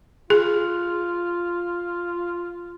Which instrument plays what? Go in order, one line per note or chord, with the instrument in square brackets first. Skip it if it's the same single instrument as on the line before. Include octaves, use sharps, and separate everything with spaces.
[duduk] F4 [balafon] G#4